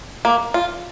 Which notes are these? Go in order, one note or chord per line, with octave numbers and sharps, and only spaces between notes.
A#3
F4